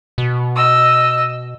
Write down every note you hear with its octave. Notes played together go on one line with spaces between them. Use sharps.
B2
D#5 E6